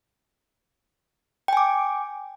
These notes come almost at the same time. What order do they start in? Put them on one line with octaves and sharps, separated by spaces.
G5 G#5 D6